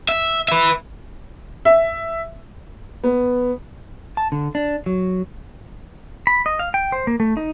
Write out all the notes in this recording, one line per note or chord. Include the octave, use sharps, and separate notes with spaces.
E5
B4 E5
E5
B3
A5
D3
D4
F#3
B5
D#5
F5
G5
C5
A#3
A3
D#4